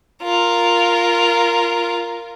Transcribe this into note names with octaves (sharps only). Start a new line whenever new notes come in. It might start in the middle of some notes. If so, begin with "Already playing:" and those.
F4 A#4